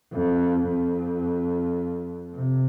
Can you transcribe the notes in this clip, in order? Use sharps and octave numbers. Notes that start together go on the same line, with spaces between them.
F2
F2
C3